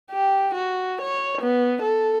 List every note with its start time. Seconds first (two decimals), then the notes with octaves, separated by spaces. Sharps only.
0.11 G4
0.54 F#4
1.01 C#5
1.41 B3
1.82 A4